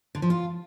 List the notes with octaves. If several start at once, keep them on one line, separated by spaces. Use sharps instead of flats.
D3
F3
F4